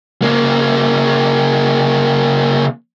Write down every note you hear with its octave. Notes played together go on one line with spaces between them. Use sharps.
C#3 A#3